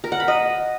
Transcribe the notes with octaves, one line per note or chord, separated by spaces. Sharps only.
A#4
F#5
B5
D#5